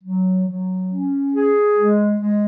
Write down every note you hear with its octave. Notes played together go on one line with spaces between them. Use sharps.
F#3
F#3
C#4
G#4
G#3
G#3